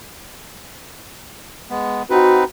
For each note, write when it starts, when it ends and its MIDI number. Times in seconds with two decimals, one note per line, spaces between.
1.70 2.03 56
1.70 2.03 59
2.10 2.44 60
2.10 2.44 63
2.10 2.40 66
2.10 2.44 71